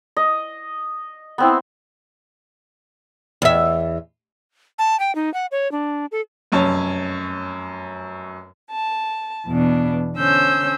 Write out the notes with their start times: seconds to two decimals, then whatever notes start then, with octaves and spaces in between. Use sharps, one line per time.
0.17 D#5
1.38 B3 C4 E4
3.42 E2 E5
4.79 A5
5.00 G5
5.15 D#4
5.34 F#5
5.52 C#5
5.72 D4
6.12 A4
6.52 F1 F#2 C#4 C#5 A5
8.70 A5
9.46 E2 B2 D4
10.16 D3 C#4 C5 E6 G6